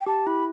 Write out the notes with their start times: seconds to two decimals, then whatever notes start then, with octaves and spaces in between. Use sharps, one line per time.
0.01 G5
0.06 G4 A5
0.27 E4 B5